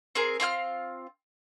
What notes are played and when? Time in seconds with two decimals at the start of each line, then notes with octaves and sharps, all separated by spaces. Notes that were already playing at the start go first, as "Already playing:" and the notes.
0.15 C4 G#4 A#4
0.40 C4 F4 G5 F6